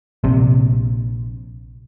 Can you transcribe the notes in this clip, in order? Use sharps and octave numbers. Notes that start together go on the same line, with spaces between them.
A#1 C3